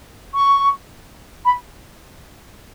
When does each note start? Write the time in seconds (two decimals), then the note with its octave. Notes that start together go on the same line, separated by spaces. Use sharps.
0.34 C#6
1.45 B5